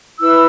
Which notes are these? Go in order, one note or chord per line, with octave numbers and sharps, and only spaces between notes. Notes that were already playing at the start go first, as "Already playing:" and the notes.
E4 B4 E6